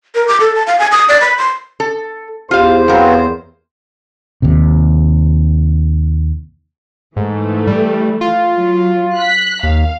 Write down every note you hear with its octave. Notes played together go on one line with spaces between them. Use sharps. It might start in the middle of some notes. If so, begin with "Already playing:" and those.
A#4
D6
A4
A5
F5
G#5
D#6
D5
B5
C6
A4
E2 F4 G4 C5 F5
F#3 B3 C4 G4 A#4 F5
D#2 C3
G#2 E3 A3
G3
F4
F#3
F#6 B6
D#2 F5